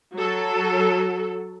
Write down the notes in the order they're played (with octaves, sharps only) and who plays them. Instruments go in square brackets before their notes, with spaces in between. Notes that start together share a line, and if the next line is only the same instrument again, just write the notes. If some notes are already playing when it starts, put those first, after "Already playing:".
[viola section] F#3 A4